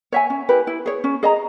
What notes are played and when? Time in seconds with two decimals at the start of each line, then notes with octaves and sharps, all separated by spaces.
0.12 C#5 E5 G#5
0.30 C#4
0.49 E4 G4 B4
0.67 E4
0.86 G#4 C#5
1.04 C#4
1.23 G#4 D#5 A#5